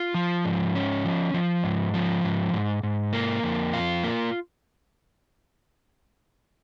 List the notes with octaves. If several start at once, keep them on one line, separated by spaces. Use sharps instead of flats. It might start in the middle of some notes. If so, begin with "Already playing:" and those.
Already playing: F4
F3
G#2
C#4
F3
F3
G#2
F3
G#2
G#2
G#2
A#3
F2
F4
A#3